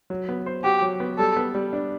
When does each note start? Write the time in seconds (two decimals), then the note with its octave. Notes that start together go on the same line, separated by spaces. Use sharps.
0.10 F#3
0.29 B3
0.46 C5
0.64 F#4 G4
0.82 F#3
1.00 B3
1.18 G3 A4
1.37 B3
1.55 G3
1.73 D4